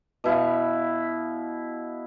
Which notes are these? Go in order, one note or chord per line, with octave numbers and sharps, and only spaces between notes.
B2 E4 B4 F5